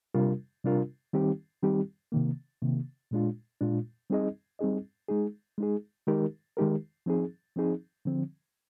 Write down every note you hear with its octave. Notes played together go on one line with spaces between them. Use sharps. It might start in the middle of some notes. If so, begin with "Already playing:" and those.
C3 G3 D4 F4 A#4
C3 G3 D4 F4 A#4
D#3 G3 C4 D#4 G4
D#3 G3 C4 D#4 G4
C3 D#3 A#3
C3 D#3 A#3
A#2 G#3 D4 F4
A#2 G#3 D4 F4
G3 C4 D#4 G#4 D#5
G3 C4 D#4 G#4 D#5
G#3 D#4 G#4
G#3 D#4 G#4
D#3 G#3 D#4 G4 A#4
D#3 G#3 D#4 G4 A#4
F3 C4 D#4 G#4
F3 C4 D#4 G#4
D3 F3 C4